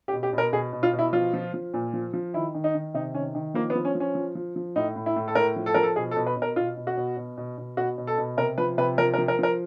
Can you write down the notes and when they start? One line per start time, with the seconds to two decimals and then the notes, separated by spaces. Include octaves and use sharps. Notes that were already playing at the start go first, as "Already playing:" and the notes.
0.08 G4
0.13 B2
0.23 G4
0.33 B2
0.38 A#4
0.53 B2 G#4
0.73 B2
0.83 F4
0.93 B2
0.99 E4
1.13 F3 F4
1.33 F3
1.54 F3
1.74 A#2
1.94 F3
2.13 F3
2.34 D#3 E4
2.54 D#3
2.64 D#4
2.74 D#3
2.94 C3 D#4
3.14 D#3 C#4
3.35 D#3
3.54 F3 A#3
3.70 B3
3.75 F3
3.85 C#4
3.95 F3
4.00 C#4
4.15 F3
4.35 F3
4.56 F3
4.76 A2 D#4
4.96 A2
5.06 E4
5.16 A2
5.28 A4
5.35 A2 A#4
5.56 F3
5.66 A4
5.74 F3 A#4
5.83 A4
5.96 B2 G#4
6.11 A4
6.16 B2
6.26 B4
6.36 B2
6.42 A#4
6.56 B2 F4
6.77 B2
6.87 F#4
6.97 B2
7.17 B2
7.37 B2
7.58 B2
7.77 B2 F#4
7.98 B2
8.07 A4
8.18 B2
8.37 C3 A#4
8.58 F3 B4
8.78 C3 B4
8.98 F3 A#4
9.14 A#4
9.18 F3
9.28 A#4
9.39 F3 A#4